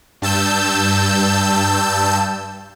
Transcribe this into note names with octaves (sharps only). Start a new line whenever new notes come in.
G2 A5 E6 G6